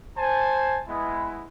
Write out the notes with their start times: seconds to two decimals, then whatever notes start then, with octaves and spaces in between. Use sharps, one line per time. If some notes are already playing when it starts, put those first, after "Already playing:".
0.16 C5 G#5 A5
0.87 G#3 B3 E4